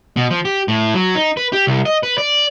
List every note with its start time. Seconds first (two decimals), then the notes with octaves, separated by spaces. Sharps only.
0.17 B2
0.31 F3
0.45 G4
0.68 A2
0.94 F#3
1.15 D#4
1.37 B4
1.53 G4
1.67 C2
1.85 D#5
2.03 B4
2.18 D5